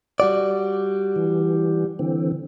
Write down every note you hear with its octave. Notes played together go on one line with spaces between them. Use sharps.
G3 F#4 D5
E3
D3 E3 C4